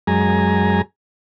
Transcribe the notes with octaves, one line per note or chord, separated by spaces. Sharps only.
F#2 G#3 G#5 A#5